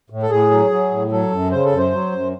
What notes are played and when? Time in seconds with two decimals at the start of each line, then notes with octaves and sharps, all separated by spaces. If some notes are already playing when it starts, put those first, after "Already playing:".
0.10 A2
0.23 A4
0.30 A2 G#4
0.51 F#3
0.71 F#3
0.91 A2
1.11 F#3 A4
1.32 F#2
1.51 C#3 C5
1.65 A4
1.72 F#2
1.78 C5
1.93 F#3
2.12 F#2